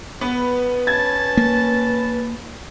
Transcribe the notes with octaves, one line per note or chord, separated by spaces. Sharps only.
B3 B4
C#4 A5 G#6 A6
A#3